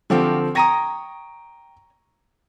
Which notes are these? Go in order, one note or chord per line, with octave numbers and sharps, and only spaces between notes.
D3 F3 C4 F#4 G4 F5
C#5 G5 A#5 D#6 A#6 D#7